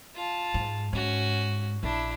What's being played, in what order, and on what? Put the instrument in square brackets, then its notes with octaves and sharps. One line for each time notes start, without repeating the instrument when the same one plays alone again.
[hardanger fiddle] F4 A5
[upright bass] G#2
[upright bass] G#2 [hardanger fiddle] C#4 F#4
[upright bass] A#1 [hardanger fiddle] D4 E4